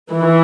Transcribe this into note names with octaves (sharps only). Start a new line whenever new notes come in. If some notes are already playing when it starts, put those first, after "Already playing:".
E3